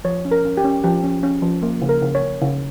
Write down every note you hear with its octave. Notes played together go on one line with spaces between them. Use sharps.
F3 C#5
C#4
A#4
C#4
G4
C#4
F3 G4
C#4
C#4
F3
A#3
C#3
A#4
C#3
C#5
C#3
C#3